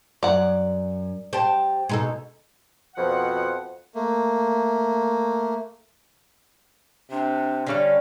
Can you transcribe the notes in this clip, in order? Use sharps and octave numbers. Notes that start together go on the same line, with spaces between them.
F#2 D5 F#5
G4 C5 G5 A5
B2 G#3 D#4 A4
F2 B2 F3 F#5
A3 A#3
C3 D4
D3 G3 C#4 F5